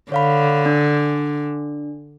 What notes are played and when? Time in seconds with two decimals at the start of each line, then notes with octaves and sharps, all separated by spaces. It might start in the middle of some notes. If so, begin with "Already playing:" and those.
0.12 D3 C#5 F5 B5
0.66 D4